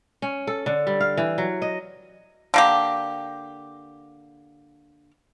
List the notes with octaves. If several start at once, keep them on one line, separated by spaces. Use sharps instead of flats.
C#4
A4
D3
G3
F5
E3
F#3
D#5
D3 A#3 G4